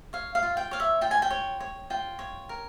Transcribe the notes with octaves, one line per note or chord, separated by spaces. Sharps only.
C#5 F5
F5
F4
G5
C#5 F5
E5
F4 G5
G#5
G5
C#5
C#5
F4 G5
C#5
A#4